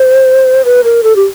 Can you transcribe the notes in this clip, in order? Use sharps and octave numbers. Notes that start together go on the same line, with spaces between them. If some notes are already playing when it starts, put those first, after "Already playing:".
Already playing: C5
B4
A#4
A4
G4